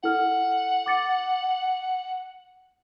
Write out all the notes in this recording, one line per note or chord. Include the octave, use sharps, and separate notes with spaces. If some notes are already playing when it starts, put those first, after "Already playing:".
E4 A4 F#5 F6
D6 A6 C#7